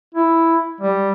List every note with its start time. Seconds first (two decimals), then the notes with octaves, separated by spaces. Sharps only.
0.14 E4
0.81 G3